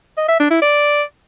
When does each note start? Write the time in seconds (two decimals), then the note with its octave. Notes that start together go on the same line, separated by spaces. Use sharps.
0.17 D#5
0.28 E5
0.40 D4
0.51 E4
0.62 D5